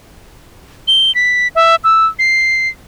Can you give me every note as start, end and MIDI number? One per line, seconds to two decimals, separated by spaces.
0.88 1.14 103
1.15 1.48 95
1.55 1.76 76
1.84 2.06 88
2.19 2.69 96